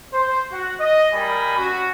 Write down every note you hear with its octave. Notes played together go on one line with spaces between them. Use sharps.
C5
F#4 F#5
D#5
G3 A#4 D5 D#5 G#5 B5
C#4 F#4